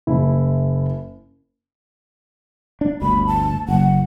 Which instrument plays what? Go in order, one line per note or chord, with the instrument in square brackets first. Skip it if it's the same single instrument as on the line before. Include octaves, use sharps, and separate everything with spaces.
[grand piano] F#1 E4
[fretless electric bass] D4
[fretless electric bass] G1 D2 [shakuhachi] B5
[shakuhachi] A5
[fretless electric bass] F#1 [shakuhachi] F#5